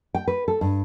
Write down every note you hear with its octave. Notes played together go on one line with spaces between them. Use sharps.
G5
B4
A4
G2